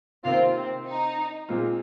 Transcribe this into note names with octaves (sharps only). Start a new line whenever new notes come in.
C3 D#3 A#3 C4 F4
C4
D#4
A#2 G#3 C4 F4